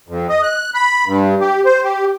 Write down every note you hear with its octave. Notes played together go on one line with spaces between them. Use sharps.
F2
D#5
F#6
B5
G2
G4
C5
G4